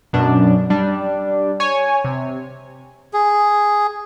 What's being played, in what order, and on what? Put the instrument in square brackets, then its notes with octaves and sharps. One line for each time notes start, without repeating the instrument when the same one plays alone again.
[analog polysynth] F#2 B2 D4
G3 D4
C#5 G#5
C3
[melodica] G#4